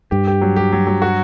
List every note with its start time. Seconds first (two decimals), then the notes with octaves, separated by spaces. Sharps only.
0.11 G2 G4
0.27 G4
0.41 F#3
0.56 G4
0.72 F#3
0.87 F#3
1.02 F#4